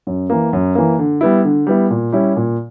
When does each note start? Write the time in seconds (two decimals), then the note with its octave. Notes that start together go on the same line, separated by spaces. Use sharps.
0.07 F#2
0.30 E3 A#3
0.53 F#2
0.75 E3 A#3
0.99 D3
1.21 G3 B3 E4
1.44 D3
1.67 G3 B3 E4
1.90 A#2
2.12 G3 C#4 E4
2.37 A#2